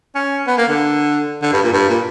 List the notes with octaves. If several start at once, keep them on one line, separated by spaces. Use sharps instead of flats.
C#4
B3
A#3
D3
D3
G2
A#2
G2
A#2